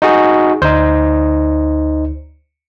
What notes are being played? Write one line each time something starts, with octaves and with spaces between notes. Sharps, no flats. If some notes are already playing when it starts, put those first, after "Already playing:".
D#4 F#4 G#4
D2 D#4 C5